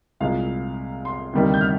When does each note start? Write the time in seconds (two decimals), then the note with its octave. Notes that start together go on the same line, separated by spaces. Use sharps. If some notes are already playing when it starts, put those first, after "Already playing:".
0.20 C2 A#2 G#3 F5
1.05 C6
1.33 D2 C3 D#3 G3 A#3
1.54 G6
1.61 F6